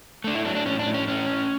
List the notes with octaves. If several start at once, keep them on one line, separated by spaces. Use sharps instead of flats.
A3 D4
E4
F#3 D4
D4
A2 C#4
D4
A2
C#4
A2 C#4
A2